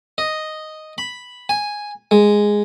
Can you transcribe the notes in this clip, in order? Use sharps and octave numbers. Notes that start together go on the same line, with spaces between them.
D#5
B5
G#5
G#3